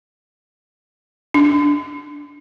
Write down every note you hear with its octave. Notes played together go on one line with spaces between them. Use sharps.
D4